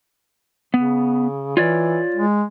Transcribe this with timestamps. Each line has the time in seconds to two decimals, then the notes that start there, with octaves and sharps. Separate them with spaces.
0.74 C#3 B3
1.57 E3 F4 C#5 D5
2.15 G#3